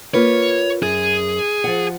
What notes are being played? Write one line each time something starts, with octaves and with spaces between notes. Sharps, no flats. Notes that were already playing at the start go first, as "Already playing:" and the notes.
A#3 F4 B4 C#5
F#2 G#4
F3 F#5